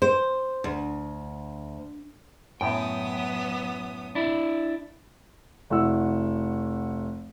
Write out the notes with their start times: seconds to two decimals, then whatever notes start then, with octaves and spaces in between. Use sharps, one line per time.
0.02 C5
0.64 D2
2.61 F#2 A2 F#3 B3 G5 D#6
4.15 D4 E4
5.70 F1 E4 F#4 F#5 E6